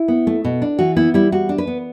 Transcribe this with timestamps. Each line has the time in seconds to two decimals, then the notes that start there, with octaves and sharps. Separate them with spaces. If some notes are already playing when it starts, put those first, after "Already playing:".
Already playing: E4
0.08 B3
0.27 A3
0.45 B2
0.62 D4
0.79 E3 F#4
0.97 B3 E4
1.14 G3 E4
1.32 G3 F#4
1.49 D4
1.58 B4
1.67 B3